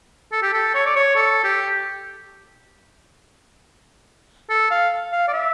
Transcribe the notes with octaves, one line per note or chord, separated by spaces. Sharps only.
A4
G4
A4
C#5
D5
C#5
A4
G4
A4
F5
F5
D5
E5